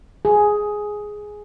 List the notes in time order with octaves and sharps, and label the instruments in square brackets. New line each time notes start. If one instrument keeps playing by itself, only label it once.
[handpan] G#4